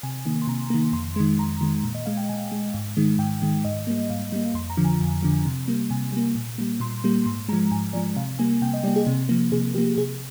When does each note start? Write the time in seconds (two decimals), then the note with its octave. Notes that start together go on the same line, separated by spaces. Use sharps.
0.03 C3 G#5
0.26 D#3 A#3
0.42 C6
0.47 C3 A#5
0.70 D#3 A#3
0.93 F2 C6
1.16 D#3 G#3
1.38 F2 A#5
1.61 D#3 G#3
1.83 A#2
1.95 D#5
2.06 G#3 F5
2.17 G5
2.29 A#2 G#5
2.52 G#3
2.74 G#2
2.97 D#3 G#3
3.19 G#2 G5
3.42 D#3 G#3
3.64 G#2 D#5
3.87 G3 A#3
4.10 G#2 F5
4.32 G3 A#3
4.54 F2 C6
4.70 A#5
4.77 D3 F3
4.84 G#5
5.00 F2
5.23 D3 F3
5.45 C3
5.68 G3 A#3
5.90 C3 G#5
6.12 G3 A#3
6.35 A#2
6.58 G3 A#3
6.80 A#2 C6
7.04 G3 A#3
7.26 G#2 C6
7.49 G#3 A#5
7.53 F3
7.71 G#2 G#5
7.93 F3 G#3 D5
8.16 C3 F5
8.39 G3 A#3 G#5
8.62 C3 G5
8.74 D#5
8.84 G3 D5
8.88 A#3
8.96 G#4
9.07 C3
9.29 F3 A#3
9.52 C3 G#4
9.75 F3 A#3 G4
9.97 C3 G#4